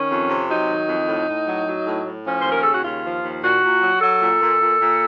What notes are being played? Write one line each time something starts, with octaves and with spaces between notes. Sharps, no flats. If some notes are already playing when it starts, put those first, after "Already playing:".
Already playing: D#3 C#4
F2
C3
F#3 D#4
D#3
F2
A2
A2
F#3
F#3
A2
A2
F3 C#4
D#2 C5
A#4
C#3 A4
F#4
D#2 F4
F3
D#2
A#2 F#4
A#2
F#3
F#3 A4
A#2
A#2
A#2
A#2